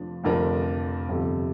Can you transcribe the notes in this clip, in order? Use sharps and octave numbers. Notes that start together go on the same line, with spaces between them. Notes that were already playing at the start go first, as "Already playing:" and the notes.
Already playing: F1 F2 F3 D4
F1 F2 F3 D4 A#4
G1 F2 C3